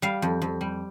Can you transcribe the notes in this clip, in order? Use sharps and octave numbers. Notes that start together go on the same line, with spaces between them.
G3 F5
F2
F2
G3